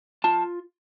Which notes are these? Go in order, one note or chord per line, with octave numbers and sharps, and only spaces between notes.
F4 A5